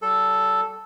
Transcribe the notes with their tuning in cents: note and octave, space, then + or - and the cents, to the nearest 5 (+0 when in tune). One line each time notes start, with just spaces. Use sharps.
G3 -35 A4 +0